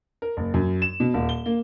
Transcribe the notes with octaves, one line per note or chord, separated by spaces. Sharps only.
A#4
F#1
F#2
E7
B2
D#1
G7
A#3